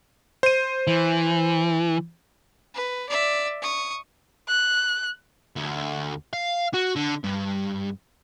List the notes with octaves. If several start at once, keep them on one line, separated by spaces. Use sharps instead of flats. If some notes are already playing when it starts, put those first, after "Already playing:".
C5 D#7
E3
B4
D5 E5
C#6 D#6
F#6
D2
F5
F#4
D3
G2